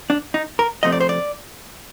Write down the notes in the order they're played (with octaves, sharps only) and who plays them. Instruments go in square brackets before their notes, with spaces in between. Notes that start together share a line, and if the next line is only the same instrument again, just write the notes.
[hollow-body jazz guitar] D4
D#4
A#4
C3 F3 A3 C4 D#5
D5
C5
D5